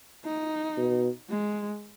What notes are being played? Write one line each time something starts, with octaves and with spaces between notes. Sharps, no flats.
D#4
B2
G#3